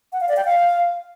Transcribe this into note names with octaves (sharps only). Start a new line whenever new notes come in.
F#5
F5
D5
G5
F5